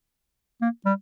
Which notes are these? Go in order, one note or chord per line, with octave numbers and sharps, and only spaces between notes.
A#3
G3